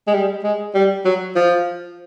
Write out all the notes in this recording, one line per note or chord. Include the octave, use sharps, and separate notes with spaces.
G#3
G3
G#3
G3
F#3
F3